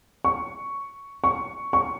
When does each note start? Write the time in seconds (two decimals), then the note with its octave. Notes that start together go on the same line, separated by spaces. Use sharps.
0.25 C#6
1.24 C#6
1.73 C#6